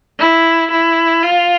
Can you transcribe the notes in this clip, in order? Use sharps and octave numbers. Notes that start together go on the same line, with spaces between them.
E4
E4
F4